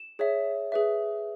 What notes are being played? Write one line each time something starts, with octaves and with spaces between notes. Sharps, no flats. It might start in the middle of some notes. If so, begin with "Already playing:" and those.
Already playing: E7
G#4 C#5 E5
G#4 B4 E5